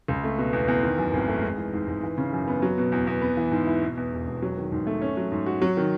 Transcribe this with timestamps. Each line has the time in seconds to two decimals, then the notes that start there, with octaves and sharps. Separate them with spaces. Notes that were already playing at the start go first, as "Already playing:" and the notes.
0.08 C#2
0.24 A3
0.38 B2
0.53 E2
0.68 E2
0.83 D#3
0.98 F#2
1.13 G#1
1.28 A3
1.43 G#3
1.58 E3
1.73 G#2
1.87 G#2
2.03 E3
2.18 C#3
2.33 F#2
2.48 B3
2.62 F#3
2.78 B2
2.92 E2
3.07 E2
3.22 B3
3.37 E3
3.52 G#2
3.67 E4
3.82 B2
3.97 E2
4.12 E1
4.27 E1
4.42 F#3
4.57 D#3
4.72 G#2
4.87 A3
5.01 C#4
5.17 F#3
5.32 G#2
5.46 F#4
5.62 F#3
5.77 D#3